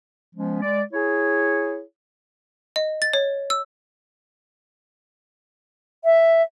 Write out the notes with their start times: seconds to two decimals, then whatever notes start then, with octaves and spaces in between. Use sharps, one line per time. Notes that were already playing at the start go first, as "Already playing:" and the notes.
0.36 F3 G#3 B3 C#4
0.62 G#3 D5
0.93 E4 G#4 C#5
2.76 D#5
3.02 A6
3.13 C#5
3.50 E6
6.04 E5